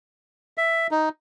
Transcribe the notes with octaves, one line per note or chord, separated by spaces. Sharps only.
E5
D#4